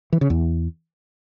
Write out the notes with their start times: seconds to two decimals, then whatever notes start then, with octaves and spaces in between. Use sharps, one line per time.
0.13 E3
0.21 C#3
0.30 E2